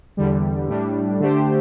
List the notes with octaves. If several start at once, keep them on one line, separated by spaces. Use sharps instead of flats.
E2 D3 G3
A2 G3 D4
D3 A3 D4 G4 C5